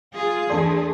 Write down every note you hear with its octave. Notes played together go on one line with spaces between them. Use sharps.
F4 G#4
E2 A3 D4 A4 D5 C6